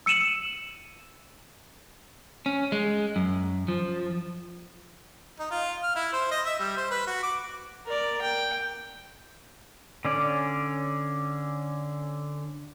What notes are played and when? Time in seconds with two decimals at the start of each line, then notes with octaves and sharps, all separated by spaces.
0.06 E6 C#7 D#7 E7 F#7
2.46 C#4
2.72 G#3
3.16 F#2
3.68 F3
5.39 D#4
5.51 F4
5.83 F6
5.96 E4
6.13 C5
6.31 D#5
6.45 E5
6.59 G3
6.77 C5
6.91 B4
7.07 F#4
7.23 D6
7.85 A#4 D5
8.21 G5
10.05 D3 C#4 D5